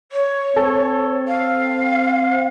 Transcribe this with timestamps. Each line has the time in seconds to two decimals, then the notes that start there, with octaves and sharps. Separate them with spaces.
0.12 C#5
0.56 C4 A4
1.27 F5